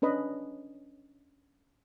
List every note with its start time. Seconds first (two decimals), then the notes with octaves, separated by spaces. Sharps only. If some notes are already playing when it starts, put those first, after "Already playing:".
0.02 C#4 D4 B4 D#5 B5